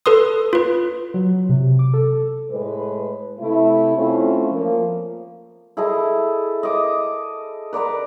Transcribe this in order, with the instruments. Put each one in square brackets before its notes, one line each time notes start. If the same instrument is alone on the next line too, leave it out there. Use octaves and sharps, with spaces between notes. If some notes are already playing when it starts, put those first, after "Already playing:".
[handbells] A4 B4 C6 D#6
F4 B4
[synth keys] F#3
C3
D6
A4
[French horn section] A2 G#3 B4
C3 A3 E4
A3 C4 C#4 E4 F4
F3 A#3
[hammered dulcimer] E4 G#4 A4 D#5
D#5 D6
B4 D5 A#5 D6